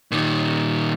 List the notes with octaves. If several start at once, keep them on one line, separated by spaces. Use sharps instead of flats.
A#2 D#3